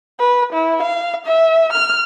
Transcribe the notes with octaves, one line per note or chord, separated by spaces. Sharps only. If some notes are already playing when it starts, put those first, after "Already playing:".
B4
E4
F5
E5
F6